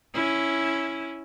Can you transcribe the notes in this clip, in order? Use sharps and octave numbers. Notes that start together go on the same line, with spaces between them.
C#4 E4